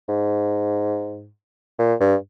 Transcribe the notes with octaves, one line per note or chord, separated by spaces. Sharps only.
G#2
A#2
G2